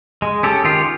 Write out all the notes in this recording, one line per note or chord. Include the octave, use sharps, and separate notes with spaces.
G#3
C#4 G4 A4
D#3 F4 G4